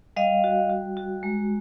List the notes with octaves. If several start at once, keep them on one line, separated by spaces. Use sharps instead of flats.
G3 D#5 F5
F#4
F#4
F#4
G#3